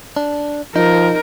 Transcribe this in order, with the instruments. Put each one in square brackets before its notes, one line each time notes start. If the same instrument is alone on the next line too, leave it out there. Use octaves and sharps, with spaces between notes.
[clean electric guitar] D4
[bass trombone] F3 [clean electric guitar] D#4 [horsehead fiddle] A#4